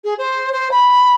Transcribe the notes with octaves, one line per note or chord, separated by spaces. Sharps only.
G#4
C5
C5
B5